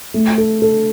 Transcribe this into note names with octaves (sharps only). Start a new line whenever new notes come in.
A3
A4
A4